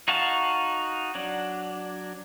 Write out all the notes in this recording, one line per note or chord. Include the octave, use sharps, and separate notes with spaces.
D#4 F#4 F5 A5
F#3 D4